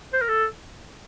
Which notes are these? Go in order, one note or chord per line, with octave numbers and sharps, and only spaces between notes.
C5
A#4
A4